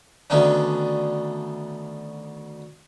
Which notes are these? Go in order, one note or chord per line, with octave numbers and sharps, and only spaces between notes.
D2 D3 D#3 B3 C#4 D4